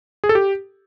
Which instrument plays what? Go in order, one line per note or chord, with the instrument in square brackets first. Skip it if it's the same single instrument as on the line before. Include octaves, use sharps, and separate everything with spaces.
[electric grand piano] G#4
A4
G4